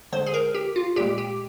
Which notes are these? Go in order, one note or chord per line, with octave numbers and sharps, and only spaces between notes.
D3 G#3 C5
G#4
A#4
G4
F4
A#2 G#3 G4
G4